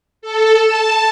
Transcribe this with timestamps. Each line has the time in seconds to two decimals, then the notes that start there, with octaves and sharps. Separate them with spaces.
0.22 A4
0.61 A5